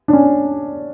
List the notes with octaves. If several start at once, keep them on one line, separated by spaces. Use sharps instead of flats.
D4
C#4